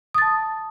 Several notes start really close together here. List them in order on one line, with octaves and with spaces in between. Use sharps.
D#6 A6 A5